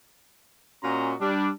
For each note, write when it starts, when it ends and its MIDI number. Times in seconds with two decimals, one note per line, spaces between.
0.83 1.13 46
0.83 1.13 61
0.83 1.13 66
0.83 1.13 75
0.83 1.13 82
0.83 1.13 84
1.20 1.50 55
1.20 1.50 62